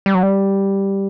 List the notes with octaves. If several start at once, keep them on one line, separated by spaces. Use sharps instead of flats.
G3
F#3
G3